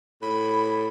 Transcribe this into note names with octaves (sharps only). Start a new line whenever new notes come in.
A2 B5